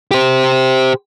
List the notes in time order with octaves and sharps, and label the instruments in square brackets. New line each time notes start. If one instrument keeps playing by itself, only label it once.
[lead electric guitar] G4 C5